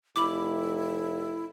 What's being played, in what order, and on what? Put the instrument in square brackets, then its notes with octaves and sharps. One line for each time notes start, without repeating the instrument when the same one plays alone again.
[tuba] F1 [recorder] E4 [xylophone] B5 D6